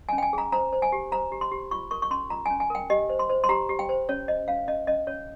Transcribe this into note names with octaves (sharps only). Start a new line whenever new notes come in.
G#5
C#4
G5
G#5
G#4 A#5
C5 A#5
C5
G#5
G4
C5 A#5
G4
C6
G4
F4 C#6
A#4 C#6
C#6
C#4 C6
F4 A#5
G#5
C#4
G#5
A#4 G5
G4 D#5
C5
C6
C5
C6
G4 A#5
G4
G5
C5
C#4 C#5
C5 D#5
C#4 F5
C#4 D#5
C#4 D#5
C#4 C#5